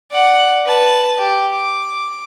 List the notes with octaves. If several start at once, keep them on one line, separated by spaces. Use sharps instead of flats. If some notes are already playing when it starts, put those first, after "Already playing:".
D5 F#5
B4 A5
G4
D6